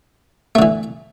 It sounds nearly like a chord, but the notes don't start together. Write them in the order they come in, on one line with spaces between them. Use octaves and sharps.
A3 D3 E3